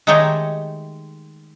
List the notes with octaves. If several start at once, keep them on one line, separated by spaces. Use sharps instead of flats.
D#3 G#3 A3 D#4 G4 C#5